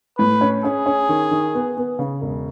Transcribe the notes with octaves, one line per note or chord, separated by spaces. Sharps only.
A2 B4
C#4
C#4 G#4
C#4
D#3
D#3
B3
B3
C#3
E1